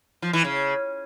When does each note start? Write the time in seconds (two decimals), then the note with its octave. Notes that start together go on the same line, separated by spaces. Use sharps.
0.22 F3
0.33 E3
0.44 C#3